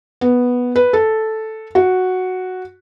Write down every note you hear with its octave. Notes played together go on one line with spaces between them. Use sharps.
B3
B4
A4
F#4